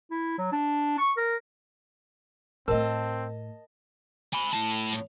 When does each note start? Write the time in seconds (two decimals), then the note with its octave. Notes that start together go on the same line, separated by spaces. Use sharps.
0.11 E4
0.38 F#3
0.52 D4
0.98 C#6
1.17 A#4
2.68 A2 A3 C4 A#4 D#5 A5
4.33 G#5 B5
4.53 A2 A5